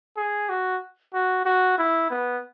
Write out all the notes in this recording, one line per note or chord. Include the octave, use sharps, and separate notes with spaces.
G#4
F#4
F#4
F#4
E4
B3